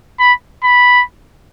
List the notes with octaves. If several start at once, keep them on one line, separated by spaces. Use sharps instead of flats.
B5
B5